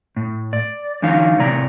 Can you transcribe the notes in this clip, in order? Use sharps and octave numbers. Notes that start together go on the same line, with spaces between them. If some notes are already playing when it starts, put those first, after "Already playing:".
A2
D5
D3 E3 F#3 D#4 F5
A2 C3 D5 A#5